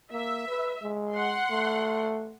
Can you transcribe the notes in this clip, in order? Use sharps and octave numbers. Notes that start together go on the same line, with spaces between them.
A#3 E5
B4
G#3
F#5 C6
A3